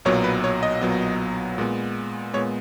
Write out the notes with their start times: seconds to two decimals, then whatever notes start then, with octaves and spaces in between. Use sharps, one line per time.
0.05 B1 A#2 F#3 B3 C#5
0.24 B4
0.44 C#5
0.63 D#5
0.81 B1 A#2 F#3 B3
1.58 A#2 G#3 B3
2.34 A#2 G#3 B3 C#5